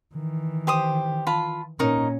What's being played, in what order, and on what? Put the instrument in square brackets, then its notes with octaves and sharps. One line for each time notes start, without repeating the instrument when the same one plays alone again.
[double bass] D#3 E3
[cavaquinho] G4 C5 D#6
F4 A5 B5
[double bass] A#2 C#4 [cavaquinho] D#4 A#4 C#6